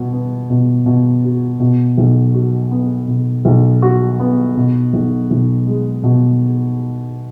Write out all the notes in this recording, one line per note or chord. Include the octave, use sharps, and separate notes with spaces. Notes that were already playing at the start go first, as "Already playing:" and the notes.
Already playing: B2 F#4
B3
B2
B2
F#4
B2
B1
F#4
B3
B2
B1
F#4
B3
B2
B1
B1
G#3
B2